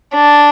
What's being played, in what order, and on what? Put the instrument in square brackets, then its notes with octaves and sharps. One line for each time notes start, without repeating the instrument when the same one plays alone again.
[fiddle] D4